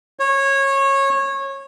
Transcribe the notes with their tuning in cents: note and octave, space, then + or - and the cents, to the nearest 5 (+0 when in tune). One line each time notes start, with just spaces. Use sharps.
C#5 -20